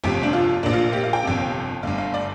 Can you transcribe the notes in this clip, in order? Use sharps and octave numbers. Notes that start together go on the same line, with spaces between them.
G1 F2 C3 G4
D4
F4
A#1 A#2 D4
F4
G4
F5
G5
G1 F2 C3
G1 G2 D3 F5
F5
D5